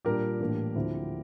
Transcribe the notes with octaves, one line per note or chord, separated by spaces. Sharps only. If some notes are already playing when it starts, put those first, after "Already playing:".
A#2 G3 D4 G4 A#4
A2 E3 A#3 D4
D2 D3 F3 C4 E4